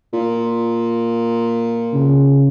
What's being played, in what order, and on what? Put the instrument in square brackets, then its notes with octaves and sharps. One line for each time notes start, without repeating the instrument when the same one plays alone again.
[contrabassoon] A#2
[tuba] C#3